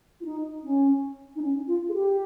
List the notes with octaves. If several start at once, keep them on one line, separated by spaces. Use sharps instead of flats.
F4
D#4
C#4
D#4
C#4
F4
G#4
G4